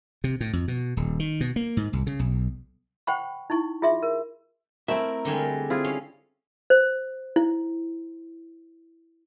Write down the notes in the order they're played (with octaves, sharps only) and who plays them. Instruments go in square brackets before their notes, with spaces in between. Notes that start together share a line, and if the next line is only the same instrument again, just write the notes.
[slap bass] C3
A2
F2
B2
D#1
D#3
B2
A#3
G#2
C2
C#3
B1
[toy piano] C5 F#5 G5 B5 C#6
D#4 E4 C#6
F4 G#4 E5 C6
A#4
[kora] A3 C4 [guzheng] E4 [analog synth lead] A#4 [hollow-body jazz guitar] E5
[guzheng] D3 G3 G#3
[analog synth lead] C4 [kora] E4 F4 G#4
[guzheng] C#4 F5
[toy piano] C5
E4